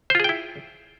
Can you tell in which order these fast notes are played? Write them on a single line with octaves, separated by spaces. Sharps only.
C5 F4 G#4 G5 E4